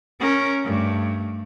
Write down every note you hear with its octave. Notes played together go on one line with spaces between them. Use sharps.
C#4 A#4
G2 A3